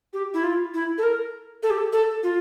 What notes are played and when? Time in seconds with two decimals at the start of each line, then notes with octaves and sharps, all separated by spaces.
0.14 G4
0.34 E4
0.44 F4
0.74 E4
0.98 A4
1.03 A#4
1.63 A4
1.70 G4
1.78 A4
1.93 A4
2.23 F4